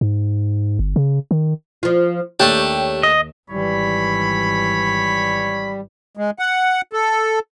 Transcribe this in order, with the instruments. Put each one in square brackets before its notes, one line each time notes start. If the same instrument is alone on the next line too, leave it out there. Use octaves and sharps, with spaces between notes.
[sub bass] G#2
G1
C#3
D#3
[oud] F3 F4
[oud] D#2 [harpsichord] A3 D4 [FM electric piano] G4 C#5 G5
[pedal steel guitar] D#5
[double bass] G#1 E3 [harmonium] G3 [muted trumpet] C#5 [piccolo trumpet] B5
[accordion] G#3
F#5
A4